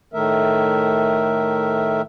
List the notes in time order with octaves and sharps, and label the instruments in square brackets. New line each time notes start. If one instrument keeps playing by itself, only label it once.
[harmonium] A2 D#3 A3 A#4 E5